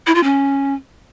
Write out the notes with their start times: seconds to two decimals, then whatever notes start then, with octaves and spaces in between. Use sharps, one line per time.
0.07 E4
0.15 F4
0.24 C#4